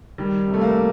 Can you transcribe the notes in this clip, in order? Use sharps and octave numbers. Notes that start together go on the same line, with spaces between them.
D#3 G3
C3
A3
A#3